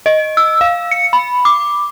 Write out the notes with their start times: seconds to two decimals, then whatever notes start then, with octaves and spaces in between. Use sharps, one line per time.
0.06 D#5
0.37 E6
0.61 F5
0.91 C#7
1.13 B5
1.45 D6